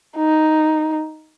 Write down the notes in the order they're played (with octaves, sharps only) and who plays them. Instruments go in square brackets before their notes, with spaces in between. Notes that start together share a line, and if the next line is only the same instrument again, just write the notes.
[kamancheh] D#4